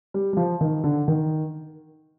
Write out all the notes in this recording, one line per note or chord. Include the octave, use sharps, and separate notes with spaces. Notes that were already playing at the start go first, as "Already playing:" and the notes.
G3
G3
F3
D#3
D3
D#3